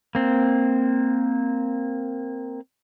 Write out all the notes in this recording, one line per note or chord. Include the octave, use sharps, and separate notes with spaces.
A#3 C4